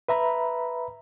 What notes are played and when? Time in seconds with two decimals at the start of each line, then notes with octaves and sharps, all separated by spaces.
0.09 B4 E5 A#5 B5